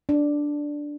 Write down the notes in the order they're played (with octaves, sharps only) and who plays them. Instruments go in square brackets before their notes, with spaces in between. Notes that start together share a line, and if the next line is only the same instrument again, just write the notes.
[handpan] D4